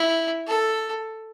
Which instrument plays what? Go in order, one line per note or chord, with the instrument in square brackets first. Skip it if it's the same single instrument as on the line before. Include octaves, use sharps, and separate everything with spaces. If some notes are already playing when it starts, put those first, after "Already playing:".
Already playing: [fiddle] E4
A4